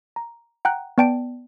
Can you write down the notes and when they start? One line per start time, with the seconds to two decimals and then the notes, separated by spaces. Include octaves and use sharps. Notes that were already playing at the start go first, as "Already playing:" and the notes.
0.16 A#5
0.65 F#5 G5 A#5 F#6
0.98 B3 D5 G5 A5 D7